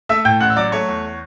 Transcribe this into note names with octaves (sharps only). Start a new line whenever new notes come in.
A3 E5 E6
A2 G5 G6
A1 F#5 F#6
E6
F#3 D5 D6
A3 C#5 C#6
E2